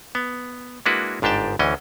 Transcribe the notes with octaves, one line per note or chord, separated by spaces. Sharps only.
B3
G#3 A#3 D4 E4 F#4 B4
G1 G#2 D4 G4 G5 A5
D2 E3 C#4 D#5